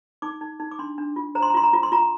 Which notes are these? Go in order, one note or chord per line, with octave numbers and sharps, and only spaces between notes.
D#4 D6
D#4
D#4
D6
D4 C6
D4
F4
C5 A#5
C6
A#5
F4 C6
A#5
F4
C6
F4 A#5